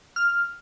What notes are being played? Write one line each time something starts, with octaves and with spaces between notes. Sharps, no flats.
F6